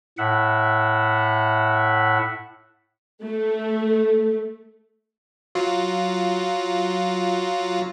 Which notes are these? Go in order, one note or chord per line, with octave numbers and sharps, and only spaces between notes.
A2 E5 F#5
A3
F#3 F4